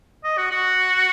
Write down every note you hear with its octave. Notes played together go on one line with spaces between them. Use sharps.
D#5
F#4
F#4